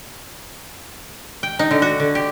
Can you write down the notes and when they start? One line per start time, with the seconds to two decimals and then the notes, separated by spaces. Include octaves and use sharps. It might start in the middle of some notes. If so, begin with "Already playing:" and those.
1.43 G5
1.59 D#4
1.71 D3
1.82 F#4
2.00 D3
2.15 G4